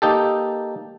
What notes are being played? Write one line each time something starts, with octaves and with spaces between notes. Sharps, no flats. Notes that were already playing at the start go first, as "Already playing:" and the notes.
A#3 D#4 G4 A4